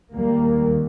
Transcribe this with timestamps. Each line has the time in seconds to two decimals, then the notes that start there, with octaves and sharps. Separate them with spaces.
0.12 D#2 G3 A#3